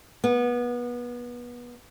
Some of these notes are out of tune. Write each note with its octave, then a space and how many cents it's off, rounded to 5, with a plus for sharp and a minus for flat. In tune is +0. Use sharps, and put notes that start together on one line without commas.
B3 -25